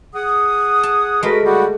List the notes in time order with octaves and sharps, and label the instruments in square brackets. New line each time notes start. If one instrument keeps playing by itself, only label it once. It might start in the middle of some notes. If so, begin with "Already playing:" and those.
[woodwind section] G#4 F#5 D#6
[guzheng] A5
[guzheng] G#3 A3 [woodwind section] F#4 A#4 B4
[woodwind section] C#3 G3 F#4